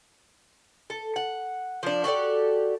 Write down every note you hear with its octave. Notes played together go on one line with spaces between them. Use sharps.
A4
F#5
F3 D4
F#4 G4 A4 D5